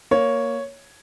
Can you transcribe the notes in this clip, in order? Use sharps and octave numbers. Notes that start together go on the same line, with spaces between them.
A#3 C#5